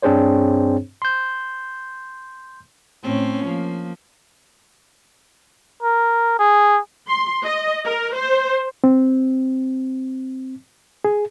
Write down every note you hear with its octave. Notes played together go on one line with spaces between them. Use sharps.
G2 C4 D4 G#4 C5 C#5
C6 G6
A2 C4 C#4
F3 A#3
A#4
G#4
C6
D#5
A#4
C5
C4
G#4